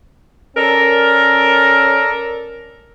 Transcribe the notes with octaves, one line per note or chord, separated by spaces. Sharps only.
C#4 A4 A#4 D5